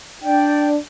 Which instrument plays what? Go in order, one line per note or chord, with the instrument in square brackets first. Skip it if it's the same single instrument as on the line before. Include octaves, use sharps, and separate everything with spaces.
[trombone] D4 [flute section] D5 G5